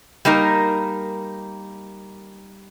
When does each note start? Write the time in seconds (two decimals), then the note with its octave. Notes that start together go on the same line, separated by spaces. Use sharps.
0.25 G3 A#3 D#4 A#4